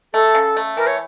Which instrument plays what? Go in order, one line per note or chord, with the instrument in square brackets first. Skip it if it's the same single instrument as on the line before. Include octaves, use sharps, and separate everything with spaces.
[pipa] A3 [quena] A4
[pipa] C#3
A3
[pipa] E3 [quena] A#4
[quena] C#5